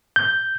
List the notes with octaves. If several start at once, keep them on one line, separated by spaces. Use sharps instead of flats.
G6